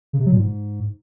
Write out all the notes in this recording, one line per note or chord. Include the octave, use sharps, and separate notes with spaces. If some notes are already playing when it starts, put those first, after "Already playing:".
C#3
C3
F#3
A#2
G#2